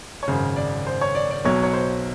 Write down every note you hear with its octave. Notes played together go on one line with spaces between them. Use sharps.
C#5
G#1 F#2 C#3 C5
D5
C5
C#5
D5
D5
B1 B2 F#3 C#5
C#5
C5